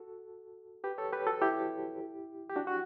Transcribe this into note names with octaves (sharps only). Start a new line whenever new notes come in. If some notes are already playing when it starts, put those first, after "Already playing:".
Already playing: F#4 A4
G4 B4
A4 C#5
G4 B4
F#4 A4
E4 G4
G4
D4 F#4
F#4